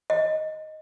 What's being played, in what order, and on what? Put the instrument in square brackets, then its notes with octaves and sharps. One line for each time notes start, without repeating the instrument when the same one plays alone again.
[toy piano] D#5